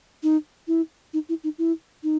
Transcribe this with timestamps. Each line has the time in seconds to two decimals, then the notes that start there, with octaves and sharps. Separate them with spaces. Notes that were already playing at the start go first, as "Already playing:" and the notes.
0.23 D#4
0.68 E4
1.13 D#4
1.29 E4
1.44 D#4
1.58 E4
2.03 D#4